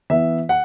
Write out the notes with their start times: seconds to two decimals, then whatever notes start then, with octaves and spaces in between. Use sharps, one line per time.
0.10 E3 B3 E5
0.49 F#5